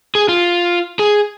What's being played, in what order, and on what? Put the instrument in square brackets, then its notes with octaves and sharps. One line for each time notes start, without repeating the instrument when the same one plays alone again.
[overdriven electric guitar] G#4
F4
G#4